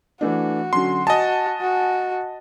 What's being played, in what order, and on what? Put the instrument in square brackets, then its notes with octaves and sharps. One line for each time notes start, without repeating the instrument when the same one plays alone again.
[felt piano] E3 A3 D4 [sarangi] F#4
[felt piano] D3 F#3 C#4 [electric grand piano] C6
[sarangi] F#4 [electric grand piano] D#5 A5 [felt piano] G#5 D#6 A6
[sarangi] F#4